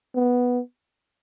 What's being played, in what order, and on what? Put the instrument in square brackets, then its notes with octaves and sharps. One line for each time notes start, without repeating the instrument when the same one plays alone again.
[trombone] B3